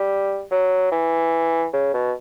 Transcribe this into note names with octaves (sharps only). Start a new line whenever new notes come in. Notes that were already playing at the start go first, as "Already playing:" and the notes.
Already playing: G3
F#3
E3
C#3
B2